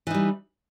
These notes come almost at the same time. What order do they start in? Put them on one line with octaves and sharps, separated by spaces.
E3 D#4 G3